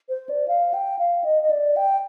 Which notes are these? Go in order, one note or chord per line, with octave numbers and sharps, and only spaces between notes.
C5
D5
F5
G5
F5
D#5
D#5
D5
G5